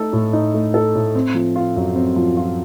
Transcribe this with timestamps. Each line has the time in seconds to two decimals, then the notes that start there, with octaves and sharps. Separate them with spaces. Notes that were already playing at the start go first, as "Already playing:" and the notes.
Already playing: A3 D#4 A4
0.13 A2
0.33 D#4
0.54 A3
0.74 A4
0.95 A2
1.15 C4
1.34 F3
1.56 F4
1.76 F#2
1.95 C4
2.16 F3
2.37 F4